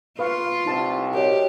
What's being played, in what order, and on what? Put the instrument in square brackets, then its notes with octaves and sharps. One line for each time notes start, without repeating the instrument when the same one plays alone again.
[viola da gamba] F4 [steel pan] B4 F5 C#6
[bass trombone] C2 [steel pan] D#4 E4 A5
[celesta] F#4 C#5 D#5 [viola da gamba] G4 [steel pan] A#4